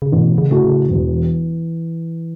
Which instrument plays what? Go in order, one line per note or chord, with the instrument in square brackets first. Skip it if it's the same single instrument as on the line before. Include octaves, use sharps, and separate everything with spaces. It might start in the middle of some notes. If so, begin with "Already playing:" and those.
[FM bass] C#3
[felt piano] A1 [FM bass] B2
[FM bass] C#3
[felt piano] A2 A3 F#4
[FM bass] C#3
[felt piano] E1 [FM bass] E3